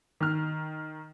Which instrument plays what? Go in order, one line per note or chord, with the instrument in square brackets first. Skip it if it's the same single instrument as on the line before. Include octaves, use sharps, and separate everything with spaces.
[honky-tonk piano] D#3 F6